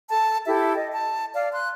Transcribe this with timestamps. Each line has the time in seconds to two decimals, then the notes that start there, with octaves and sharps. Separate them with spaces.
0.10 A4 A5
0.46 E4 G4 A4 E5
0.77 D#5
0.93 A5
1.34 D5 F5
1.53 C6 F#6